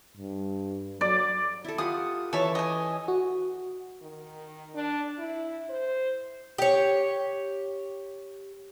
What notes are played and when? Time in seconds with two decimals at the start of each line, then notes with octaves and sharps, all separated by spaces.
0.17 G2
1.01 F#3 D5
1.64 E4 A4
1.78 F4 G4 F#5 D#6
2.33 E3 A4 C#5 E5
2.55 D#5 G#5
3.08 F#4
4.02 D#3
4.75 D4
5.18 E4
5.70 C5
6.58 G4 C#5